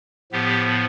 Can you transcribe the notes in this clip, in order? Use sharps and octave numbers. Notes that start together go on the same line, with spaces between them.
A2 F3 B3 G4